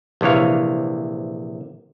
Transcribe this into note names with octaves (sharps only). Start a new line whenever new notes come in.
A#1 C3 E3 C#5 F5